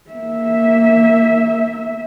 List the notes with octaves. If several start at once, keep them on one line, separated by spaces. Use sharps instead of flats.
A#3 E5